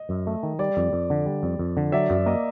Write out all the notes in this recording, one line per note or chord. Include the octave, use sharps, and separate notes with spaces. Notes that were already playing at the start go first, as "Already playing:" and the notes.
Already playing: D#5
F#2
A3
D#3
G3 D5
F2
F2
D3
G3
F2
F2
D3
F#3 D5 E5
F#2
A#3 D#5